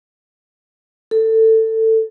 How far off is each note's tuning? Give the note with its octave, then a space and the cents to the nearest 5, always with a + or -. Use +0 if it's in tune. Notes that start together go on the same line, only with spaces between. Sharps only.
A4 +20